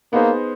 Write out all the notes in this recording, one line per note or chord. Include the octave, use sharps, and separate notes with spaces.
A#3 B3 D#4 G#4 C5